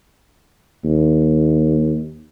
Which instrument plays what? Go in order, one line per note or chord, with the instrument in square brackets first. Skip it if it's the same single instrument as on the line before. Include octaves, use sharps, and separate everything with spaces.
[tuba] D#2